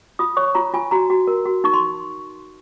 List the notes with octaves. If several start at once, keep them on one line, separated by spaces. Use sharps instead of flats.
F4 D#6
C#5 C#6
F4 A#5
F4 G#5
F#4 A#5
F#4
A#4
F#4
D#4 C#6
C6